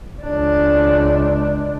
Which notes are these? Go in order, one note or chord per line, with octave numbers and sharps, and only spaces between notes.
C#2 D4